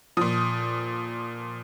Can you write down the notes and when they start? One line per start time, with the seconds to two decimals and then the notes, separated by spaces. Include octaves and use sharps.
0.17 A#2 F3 D#6